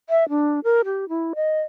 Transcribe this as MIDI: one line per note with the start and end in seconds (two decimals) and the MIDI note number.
0.10 0.28 76
0.29 0.60 62
0.64 0.82 70
0.85 1.08 67
1.09 1.33 64
1.35 1.61 75